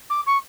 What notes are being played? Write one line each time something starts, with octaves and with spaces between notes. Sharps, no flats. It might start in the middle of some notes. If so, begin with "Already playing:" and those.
D6
C#6